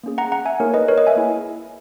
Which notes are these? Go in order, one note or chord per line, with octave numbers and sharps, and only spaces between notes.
A#3 C#4 G#4
F#5 A#5
F#5 A#5
E5 G#5
A#3 D#4 G#4 A#4 C#5
B4 D#5
A#4 C#5
B4 D#5
E5 G#5
A#3 E4 G#4